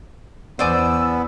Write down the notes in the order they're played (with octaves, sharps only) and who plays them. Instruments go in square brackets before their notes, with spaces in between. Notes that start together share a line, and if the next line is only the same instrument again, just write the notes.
[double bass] E2 [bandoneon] B3 [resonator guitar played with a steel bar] C5 D5 G#5 [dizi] E6